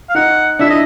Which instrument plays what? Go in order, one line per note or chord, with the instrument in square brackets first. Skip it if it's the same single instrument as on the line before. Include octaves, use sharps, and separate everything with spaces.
[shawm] F5
[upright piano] D#4 [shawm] F#5
[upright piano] D4 E4 [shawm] E5
[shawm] D#5